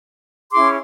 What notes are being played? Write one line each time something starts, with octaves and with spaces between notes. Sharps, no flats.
C#4 E4 G#4 C6 D6